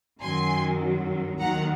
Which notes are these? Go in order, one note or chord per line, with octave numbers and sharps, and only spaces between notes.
F#2 D#3 F#3 G#5 C6
D#2 D#3 F#3 F#5 A#5